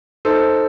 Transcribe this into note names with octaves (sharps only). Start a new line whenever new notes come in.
D#4 A4 C5